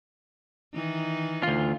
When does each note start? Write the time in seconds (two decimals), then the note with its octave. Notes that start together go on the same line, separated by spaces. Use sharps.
0.74 D#3 E3 D#4
1.43 D2 F4